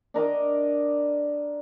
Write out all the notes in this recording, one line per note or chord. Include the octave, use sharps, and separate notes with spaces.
D4 A#4 D#5 D6